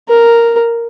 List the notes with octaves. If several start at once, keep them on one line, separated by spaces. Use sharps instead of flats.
A#4